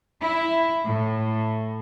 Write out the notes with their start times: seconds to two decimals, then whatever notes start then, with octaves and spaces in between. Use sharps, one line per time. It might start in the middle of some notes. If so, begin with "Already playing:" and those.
0.22 E4
0.86 A2